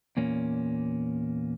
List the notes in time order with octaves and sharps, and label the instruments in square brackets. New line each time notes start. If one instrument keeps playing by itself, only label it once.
[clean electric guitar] E2 A#2 A#3 C#4